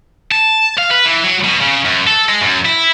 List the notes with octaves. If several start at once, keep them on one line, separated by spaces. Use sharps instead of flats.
A5
F5
B4
E3
F#3
B2
C#3
F#2
A4
G#3
F#2
E4